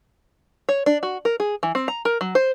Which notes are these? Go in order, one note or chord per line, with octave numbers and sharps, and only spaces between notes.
C#5
D4
F#4
A#4
G#4
E3
C4
A#5
A#4
F#3
C5